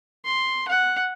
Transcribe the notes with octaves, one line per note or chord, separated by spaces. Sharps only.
C6
F#5